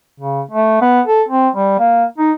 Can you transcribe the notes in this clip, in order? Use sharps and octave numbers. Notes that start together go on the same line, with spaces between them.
C#3
A3
B3
A4
C4
G3
A#3
D#4